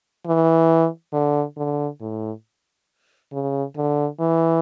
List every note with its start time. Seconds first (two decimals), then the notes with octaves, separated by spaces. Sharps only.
0.26 E3
1.13 D3
1.57 D3
2.01 A2
3.32 C#3
3.76 D3
4.20 E3